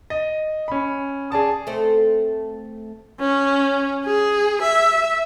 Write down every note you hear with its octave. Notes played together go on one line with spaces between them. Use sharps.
D#5
C#4 B5
G#4 D5 A5 D#6
A3 C4
C#4
G#4
E5